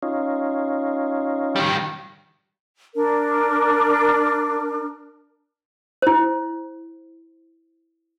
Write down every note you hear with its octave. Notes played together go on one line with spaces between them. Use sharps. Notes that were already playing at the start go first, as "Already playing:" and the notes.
C#4 D#4 F4
D#3 G3
D4 A#4
E4 C5